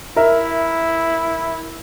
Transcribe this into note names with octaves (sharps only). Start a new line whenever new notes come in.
E4 A#4 E5